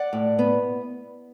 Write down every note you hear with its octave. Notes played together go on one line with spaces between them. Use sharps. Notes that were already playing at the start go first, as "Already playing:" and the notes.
Already playing: D5 F#5
A2
B3